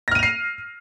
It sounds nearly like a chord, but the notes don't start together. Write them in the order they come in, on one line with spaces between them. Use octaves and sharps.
A#6 F6 D#7 F7 C7